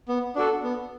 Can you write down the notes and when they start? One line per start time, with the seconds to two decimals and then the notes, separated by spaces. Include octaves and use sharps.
0.08 B3
0.36 D4 F#4 A4
0.63 B3